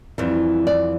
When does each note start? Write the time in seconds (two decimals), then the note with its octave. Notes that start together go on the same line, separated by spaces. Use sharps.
0.18 F2 E3 G3
0.67 D5